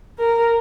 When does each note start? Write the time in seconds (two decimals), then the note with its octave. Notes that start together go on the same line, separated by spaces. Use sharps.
0.19 A#4